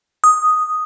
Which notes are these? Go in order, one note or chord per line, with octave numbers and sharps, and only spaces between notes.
D#6